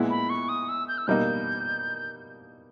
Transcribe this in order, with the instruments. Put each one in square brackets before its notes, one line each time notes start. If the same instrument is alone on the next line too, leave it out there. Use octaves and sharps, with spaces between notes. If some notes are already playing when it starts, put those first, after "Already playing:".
Already playing: [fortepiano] A#2 G#3 B3 E4
[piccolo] B5
C#6
D#6
E6
G6
E6
[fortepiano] B2 G3 A#3 D#4 [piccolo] G6